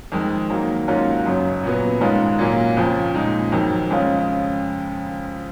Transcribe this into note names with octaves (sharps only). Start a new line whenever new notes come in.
F2 D#3 G#3
D#3 F#3 A#3
G#2 F#3 A#3 C#4 F4
F#2 C#3 F#3
A#2 F#3 B3
G#2 D#3 G#3 C#4 F4
A#2 F#3 A#3 C#4
F2 C#3 F3
A#2 G#3 D#4
F2 D#3 F#3
F2 C#3 G#3 C#4 F4